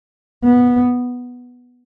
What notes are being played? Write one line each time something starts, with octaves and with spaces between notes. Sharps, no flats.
B3